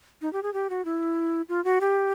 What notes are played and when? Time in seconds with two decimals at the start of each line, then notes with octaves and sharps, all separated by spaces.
0.22 D#4
0.33 G4
0.43 G#4
0.53 G4
0.70 F#4
0.85 E4
1.49 F4
1.65 F#4
1.81 G4